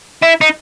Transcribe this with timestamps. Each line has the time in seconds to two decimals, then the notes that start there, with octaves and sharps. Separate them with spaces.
0.22 E4
0.41 D#4